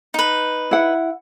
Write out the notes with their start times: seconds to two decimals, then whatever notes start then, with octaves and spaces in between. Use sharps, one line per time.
0.14 D#4 B4
0.71 E4 F#5